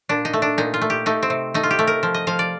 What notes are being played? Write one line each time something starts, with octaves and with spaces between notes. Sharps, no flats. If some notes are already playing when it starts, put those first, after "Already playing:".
A#2 D4
D#4
A3
D4
A#2 D#4
F4
A3
G4
A3 D#4
C4
C3
A3 D#4
F4
G4
A3
A#4
F3
D#5
F3 F5
D5